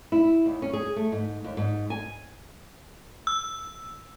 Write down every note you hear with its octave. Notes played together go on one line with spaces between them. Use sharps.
E4
D#2
C#4
G#4
A3
G#2
D#2
G#2
G#5
E6